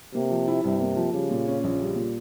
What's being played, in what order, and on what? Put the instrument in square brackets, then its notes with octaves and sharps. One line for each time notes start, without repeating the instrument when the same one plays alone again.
[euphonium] C3 [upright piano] A#3
[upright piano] F3
E4
[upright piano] G2 [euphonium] C3
[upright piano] A#3
F3
[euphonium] C#3 [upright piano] G3
[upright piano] A#2
C#4
[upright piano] A#1 [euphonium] C#3
[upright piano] G3
A#2